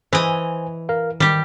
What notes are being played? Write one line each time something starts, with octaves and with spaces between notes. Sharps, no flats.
E3 C5 D#5 G#5
A#4 F5
D#3 G3 G4